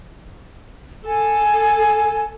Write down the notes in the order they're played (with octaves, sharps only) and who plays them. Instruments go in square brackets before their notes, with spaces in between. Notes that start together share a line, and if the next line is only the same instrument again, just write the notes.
[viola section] A4 [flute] G#5